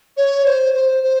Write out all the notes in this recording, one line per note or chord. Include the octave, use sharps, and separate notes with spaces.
C#5
C5
C5
C5